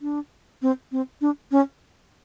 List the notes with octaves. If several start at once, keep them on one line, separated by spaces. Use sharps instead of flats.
D4
C4
C4
D4
C#4